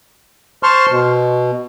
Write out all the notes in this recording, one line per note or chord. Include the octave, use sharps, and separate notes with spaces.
C5 A5 C6 C#6 F6
B2